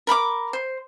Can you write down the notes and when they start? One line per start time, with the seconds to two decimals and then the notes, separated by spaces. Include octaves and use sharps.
0.07 A#4 B5 C#6 D6
0.53 C5